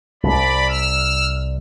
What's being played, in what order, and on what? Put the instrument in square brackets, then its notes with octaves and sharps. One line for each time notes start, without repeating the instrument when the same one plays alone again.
[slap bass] C2 [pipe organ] D5 B5
[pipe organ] E6 F6